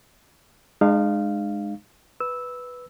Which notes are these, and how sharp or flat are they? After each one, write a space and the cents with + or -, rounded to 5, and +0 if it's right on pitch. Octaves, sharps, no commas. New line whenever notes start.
G#3 +0 D#4 -45 F5 -5
B4 +0 E6 -10